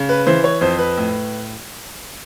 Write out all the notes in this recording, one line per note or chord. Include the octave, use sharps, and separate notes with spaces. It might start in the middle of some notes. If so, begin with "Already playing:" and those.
Already playing: C#3
B4
E3 C5
C#5
F2 C5
B4
A2